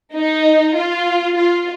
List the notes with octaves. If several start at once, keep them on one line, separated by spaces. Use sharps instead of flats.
D#4
F4
F4